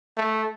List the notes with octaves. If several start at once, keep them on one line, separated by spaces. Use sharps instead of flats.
A3